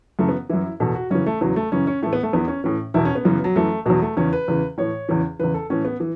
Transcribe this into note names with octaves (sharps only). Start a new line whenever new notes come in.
F#2 C#3 E3 A3
B3
F#2 E3 E4
E2 B2 A4
F#4
F#2 C#3 E3 C#4
A3
E2 C#3 E3 F#3
A3
F#2 C#3 E3 C#4
C#4
A2 E3 A3
B3
A3
E2 E3 B3
C#4
A2 E3 C#4
E2 B2 E4
C#4
B3
F#2 C#3 E3
F#3
F#2 E3 A3
E2 B2 F#3
A3
E2 C#3 E3 C#4
B4
E2 C#3 E3
A2 E3 C#5
E2 C#3 E3
E2 C#3 E3 B4
A4
A2 E3 C#4
B3
E3